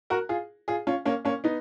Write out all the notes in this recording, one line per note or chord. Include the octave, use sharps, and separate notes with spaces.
F#4 A#4
F4 G#4
F4 G#4
C#4 F4
A#3 C#4
A#3 C#4
B3 D#4